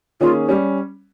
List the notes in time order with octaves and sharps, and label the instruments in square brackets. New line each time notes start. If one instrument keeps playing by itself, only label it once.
[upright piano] D#3 A#3 C#4 G#4 [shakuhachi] F4
[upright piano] G3 C#4 [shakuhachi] G4